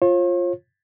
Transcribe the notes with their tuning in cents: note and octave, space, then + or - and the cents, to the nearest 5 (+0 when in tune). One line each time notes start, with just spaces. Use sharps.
F4 +0 C#5 -45